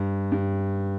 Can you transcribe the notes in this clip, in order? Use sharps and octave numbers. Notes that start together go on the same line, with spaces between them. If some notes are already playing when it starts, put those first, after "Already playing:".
Already playing: G2
G2